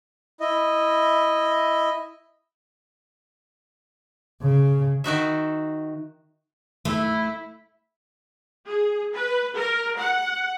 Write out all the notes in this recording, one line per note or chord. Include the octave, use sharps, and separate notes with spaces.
E4 D#5
C#3
D#3 D#4 F#4 E5
A3 E4
G#4
B4
A#4
F#5